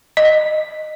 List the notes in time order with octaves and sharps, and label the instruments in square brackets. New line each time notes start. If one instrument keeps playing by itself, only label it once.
[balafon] D#5